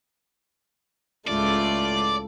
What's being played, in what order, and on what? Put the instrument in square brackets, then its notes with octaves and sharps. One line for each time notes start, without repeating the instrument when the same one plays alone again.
[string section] C#2 A2 [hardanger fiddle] A3 F4 [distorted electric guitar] D5